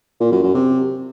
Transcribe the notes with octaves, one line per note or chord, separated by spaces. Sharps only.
A#2
F#2
F#2
C3